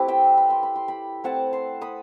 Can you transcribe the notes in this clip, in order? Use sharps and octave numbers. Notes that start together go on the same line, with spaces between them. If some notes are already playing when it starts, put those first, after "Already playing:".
Already playing: A3 C4 E4 G4 B4
E5 G5
B5
C6
B5
C6
G5 B5
A3 C4 E4 F#5 A5
A5 C6
B5 D#6